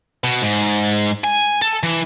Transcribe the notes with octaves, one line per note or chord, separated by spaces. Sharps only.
B2
G#2
G#5
A4
E3